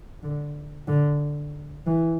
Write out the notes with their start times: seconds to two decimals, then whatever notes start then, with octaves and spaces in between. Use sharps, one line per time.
0.23 D3
0.88 D3
1.86 E3